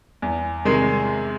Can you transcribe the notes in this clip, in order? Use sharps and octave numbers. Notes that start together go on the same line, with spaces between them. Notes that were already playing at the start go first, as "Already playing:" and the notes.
E2
C3 D#3 G#3